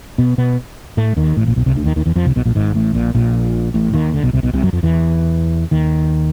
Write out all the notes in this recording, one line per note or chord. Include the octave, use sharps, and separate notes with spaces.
B2 B3
B2 B3
A2 A3
D#2 D#3
A1 A2
A#1 A#2
B1 B2
C2 C3
D2 D3
D#2 D#3
D#2 D#3
E2 E3
F2 F3
C2 C3
B1 B2
A#1 A#2
G#1 G#2
A1 A2
A#1 A#2
A#1 A#2
A1 A2
D#2 D#3
D2 D3
B1 B2
C2 C3
B1 B2
C2 C3
F#2 F#3
F2 F3
E2 E3
D#2 D#3